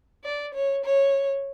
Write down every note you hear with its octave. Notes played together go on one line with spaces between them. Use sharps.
D5
C#5
C#5